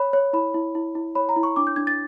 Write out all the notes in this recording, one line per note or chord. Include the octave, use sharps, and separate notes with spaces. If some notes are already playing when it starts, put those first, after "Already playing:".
Already playing: C#5 B5
C#5
E4 B5
E4
E4
E4
C#5 B5
A#5
E4
C#6
D4 D6
G6
D4 G#6
A6